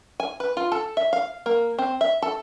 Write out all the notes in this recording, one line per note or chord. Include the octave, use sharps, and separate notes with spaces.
G#5
B4
F4
A4
E5
F5
A#3
C4
E5
A4